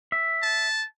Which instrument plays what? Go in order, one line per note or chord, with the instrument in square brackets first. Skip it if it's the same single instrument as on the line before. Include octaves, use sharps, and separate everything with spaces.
[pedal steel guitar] E5
[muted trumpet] A5